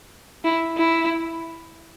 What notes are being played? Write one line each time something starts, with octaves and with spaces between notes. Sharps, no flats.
E4
E4